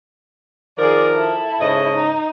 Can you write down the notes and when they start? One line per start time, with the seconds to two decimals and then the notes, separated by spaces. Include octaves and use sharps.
0.78 D#3 F3 G#4 A#4 D5
1.13 E4 A4
1.61 G#2 C#3 D#5
1.94 D#4